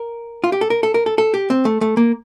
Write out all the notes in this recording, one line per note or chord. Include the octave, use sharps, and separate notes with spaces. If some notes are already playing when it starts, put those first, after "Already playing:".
Already playing: A#4
F4
G4
A4
A#4
A4
A#4
A4
A4
G4
C4
A3
A3
A#3